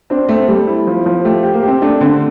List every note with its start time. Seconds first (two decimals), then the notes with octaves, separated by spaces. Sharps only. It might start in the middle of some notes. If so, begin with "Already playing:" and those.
0.10 C4 D4
0.29 A3 C4
0.48 G3 A3
0.67 E4
0.87 F3
1.06 F3
1.24 A3 G4
1.43 G4
1.53 A#3
1.63 G4
1.68 C4
1.82 A3 D4
2.01 D3 C4